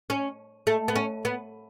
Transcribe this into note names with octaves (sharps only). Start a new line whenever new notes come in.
C#4
A3
B3
C#4
B3